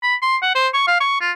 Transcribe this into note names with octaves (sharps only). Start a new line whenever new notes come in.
B5
C6
F#5
C5
C#6
F5
C#6
F4